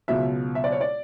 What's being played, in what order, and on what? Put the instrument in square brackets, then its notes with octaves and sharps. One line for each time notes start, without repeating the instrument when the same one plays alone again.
[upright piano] C#2 B2 F#3 E5
E5
D5
C#5
D5